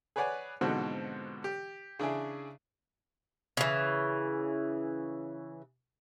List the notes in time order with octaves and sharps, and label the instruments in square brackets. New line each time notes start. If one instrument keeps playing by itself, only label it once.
[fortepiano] G#4 B4 C#5 D5 F#5 G#5
G#2 B2 D3 F3 C4 F#4
G4
C#3 D4 E4 G#4
[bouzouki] C#3 E3